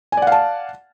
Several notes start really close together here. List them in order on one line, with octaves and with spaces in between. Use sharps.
G#5 D5 F#5 F5 A5